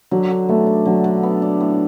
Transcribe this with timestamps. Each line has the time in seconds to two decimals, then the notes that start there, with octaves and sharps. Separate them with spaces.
0.11 D3 F#3
0.30 D3
0.49 A3 B3
0.67 D4
0.85 D3 F#3
1.04 D3
1.23 B3
1.42 D4
1.61 A2